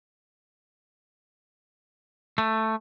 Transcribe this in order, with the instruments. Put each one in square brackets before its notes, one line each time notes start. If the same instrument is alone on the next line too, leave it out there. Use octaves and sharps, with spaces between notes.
[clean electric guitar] A3